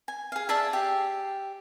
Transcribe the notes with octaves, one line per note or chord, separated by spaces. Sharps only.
G#5
G#4 F5
G#4 D5 E5 A5
G4